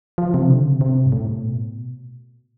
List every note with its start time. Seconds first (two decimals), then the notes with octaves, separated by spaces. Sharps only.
0.18 F3
0.34 C3
0.49 D3
0.65 C3
0.81 C3
1.06 G2
1.12 A2
1.44 B2